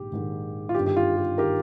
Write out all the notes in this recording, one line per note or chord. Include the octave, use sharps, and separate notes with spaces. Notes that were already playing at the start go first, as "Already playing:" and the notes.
Already playing: A#1 G#2 D#3 G4
A#1 G#2 D#3
F4
G1 G2 D#3 G4
G4
F4
G4
D#3 G4 A#4